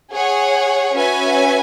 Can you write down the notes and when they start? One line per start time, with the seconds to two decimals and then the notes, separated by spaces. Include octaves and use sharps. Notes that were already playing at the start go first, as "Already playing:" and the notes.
0.13 G#4 C#5 F#5
0.96 C#4 F#4 B4 E5 G#5